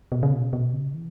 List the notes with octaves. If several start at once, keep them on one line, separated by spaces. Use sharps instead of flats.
B2
C#3
B2
B2
C#3
E3